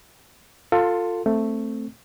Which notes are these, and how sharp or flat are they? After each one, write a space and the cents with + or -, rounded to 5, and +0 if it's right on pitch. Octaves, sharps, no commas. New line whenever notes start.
F4 +15 A4 +25 C6 +0
A3 +10 C4 +0